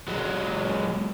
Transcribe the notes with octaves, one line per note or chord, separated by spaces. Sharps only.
F#3 G#3